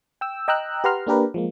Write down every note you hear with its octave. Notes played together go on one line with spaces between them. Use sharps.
G5 E6
D#5 G5 A#5 E6 F#6
G4 B4 F#5 A#5 C6 F6
A#3 D4 G4 A#4 B4
F3 G#3 A#3